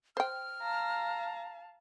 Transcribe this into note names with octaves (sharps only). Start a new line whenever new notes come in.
C5 G5 F6
F5 A5 A#5